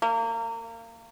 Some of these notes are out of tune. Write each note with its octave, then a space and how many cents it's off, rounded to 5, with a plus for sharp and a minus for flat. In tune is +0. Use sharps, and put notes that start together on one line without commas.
A#3 -30